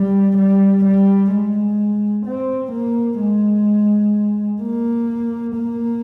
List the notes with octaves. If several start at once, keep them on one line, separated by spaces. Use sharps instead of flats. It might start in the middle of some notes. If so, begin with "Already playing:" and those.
Already playing: G3
G3
G3
G#3
C4
A#3
G#3
A#3
A#3